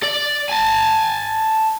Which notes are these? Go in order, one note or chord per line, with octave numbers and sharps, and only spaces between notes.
D5
G#5 A5